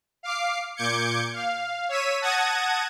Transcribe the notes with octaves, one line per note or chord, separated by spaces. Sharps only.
F5 D6 C7
A#2 D6 G6 G#6 C#7
F5
C#5 E6 B6 D#7
F#5 A5 D#6 G#6 A#6 D#7